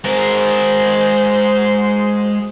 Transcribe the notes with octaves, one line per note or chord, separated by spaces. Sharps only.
G#3 F#4 G#4 A#4 C5